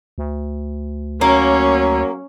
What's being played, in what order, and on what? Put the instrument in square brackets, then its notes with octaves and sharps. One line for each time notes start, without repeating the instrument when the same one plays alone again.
[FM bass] D2
[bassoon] F#3 [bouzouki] A#3 [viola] C#4